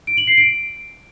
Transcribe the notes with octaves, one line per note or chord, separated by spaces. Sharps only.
D7
F#7
C7
D7